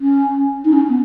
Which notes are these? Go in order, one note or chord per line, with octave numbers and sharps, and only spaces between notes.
C#4
D#4
C#4
B3